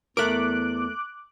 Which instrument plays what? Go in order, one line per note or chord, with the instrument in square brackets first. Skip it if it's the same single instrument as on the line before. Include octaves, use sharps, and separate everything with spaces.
[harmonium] E2 [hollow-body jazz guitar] A3 A#4 [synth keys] D6 F#6